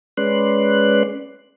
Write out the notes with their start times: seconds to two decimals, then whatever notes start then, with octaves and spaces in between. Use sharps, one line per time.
0.17 G#3 C#4 B4 D5 C6 F#6